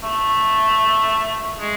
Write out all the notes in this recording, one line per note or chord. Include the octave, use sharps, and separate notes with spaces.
A3
G#3